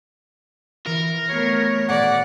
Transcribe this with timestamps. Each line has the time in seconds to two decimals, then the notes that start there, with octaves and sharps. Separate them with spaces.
0.86 E3 A#4
1.29 A3 B3 F#4 C#5 C7 C#7
1.89 D#1 D5 F#5 B6